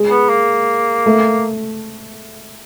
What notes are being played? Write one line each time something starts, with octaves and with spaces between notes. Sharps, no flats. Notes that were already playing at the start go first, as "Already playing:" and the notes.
Already playing: G#3
B3
A#3
A3